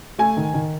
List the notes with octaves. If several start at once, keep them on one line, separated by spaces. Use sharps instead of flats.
A3 G#5
D#3
D#3